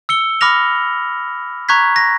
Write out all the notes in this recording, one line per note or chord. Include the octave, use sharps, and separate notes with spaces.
E6 C#7 G7
B5 D6 F6 A#6 F7
A#5 C#6 F#6 G#6 B6
A#6